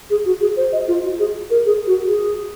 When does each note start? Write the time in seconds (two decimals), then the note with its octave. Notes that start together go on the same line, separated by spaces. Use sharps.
0.10 G#4
0.26 F#4
0.41 G#4
0.57 C5
0.72 D#5
0.88 F4
1.04 F#4
1.19 G#4
1.50 A#4
1.66 G#4
1.87 F#4
2.08 G#4